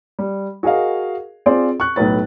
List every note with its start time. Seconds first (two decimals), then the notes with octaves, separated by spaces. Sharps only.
0.19 G3
0.63 F#4 G#4 A#4 D#5 F5
1.46 C4 F4 G#4 C5 D5
1.80 C#6 F#6
1.96 B1 A2 B4 A6